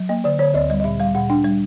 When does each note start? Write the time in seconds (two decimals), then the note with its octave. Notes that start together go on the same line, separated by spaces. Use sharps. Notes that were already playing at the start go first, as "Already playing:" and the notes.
Already playing: F#3
0.09 A#3 D#5
0.24 D3 D5
0.39 D3 C#5
0.54 D2 D5
0.70 G3 D#5
0.80 D#5
0.84 A#2 E5
1.00 G3 F5
1.15 A#2 F#5
1.30 D4 G5
1.45 G3